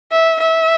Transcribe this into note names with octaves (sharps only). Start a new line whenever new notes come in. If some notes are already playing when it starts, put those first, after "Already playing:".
E5
E5